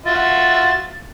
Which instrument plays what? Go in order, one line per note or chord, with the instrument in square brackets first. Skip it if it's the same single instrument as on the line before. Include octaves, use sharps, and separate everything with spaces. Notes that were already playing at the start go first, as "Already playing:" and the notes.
[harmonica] F4 F#4 E5 [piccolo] A6